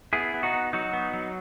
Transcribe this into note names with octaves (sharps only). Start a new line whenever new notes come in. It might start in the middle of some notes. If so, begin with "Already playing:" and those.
B3 E4 G#4
B3
D#4 F#4
B3
F#3 D#4 F#4
B3
F#3